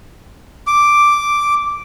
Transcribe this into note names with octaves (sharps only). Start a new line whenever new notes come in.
D6